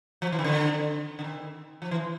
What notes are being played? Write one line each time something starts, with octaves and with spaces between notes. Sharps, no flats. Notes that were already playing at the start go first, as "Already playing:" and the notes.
F3
E3
D#3
D3
D3
D#3
F3
E3